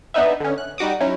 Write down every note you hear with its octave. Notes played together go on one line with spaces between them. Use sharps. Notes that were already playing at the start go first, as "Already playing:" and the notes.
B3 D4 D#4 B4 E5
D3 C#4
F#6
G3 D#4 F#4 D6 D#6
F#3 C#4 D#4 E4